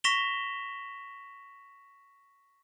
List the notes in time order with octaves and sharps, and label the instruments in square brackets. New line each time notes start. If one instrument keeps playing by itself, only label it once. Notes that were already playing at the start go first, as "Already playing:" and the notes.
[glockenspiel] C#6 A#6 B6 E7 F7 G7